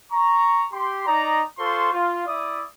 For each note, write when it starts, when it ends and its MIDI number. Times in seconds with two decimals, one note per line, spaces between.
0.12 0.66 82
0.12 0.66 85
0.72 1.06 67
0.72 1.06 84
1.07 1.43 63
1.07 1.43 74
1.07 1.43 75
1.07 1.43 82
1.59 1.91 65
1.59 1.91 69
1.59 1.91 72
1.59 1.91 84
1.59 1.91 85
1.93 2.26 65
2.27 2.64 64
2.27 2.64 74
2.27 2.64 76
2.27 2.64 87